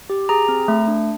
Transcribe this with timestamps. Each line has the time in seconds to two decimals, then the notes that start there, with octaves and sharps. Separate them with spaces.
0.10 G4
0.29 G#4 A#5
0.49 C4
0.68 A3
0.87 D4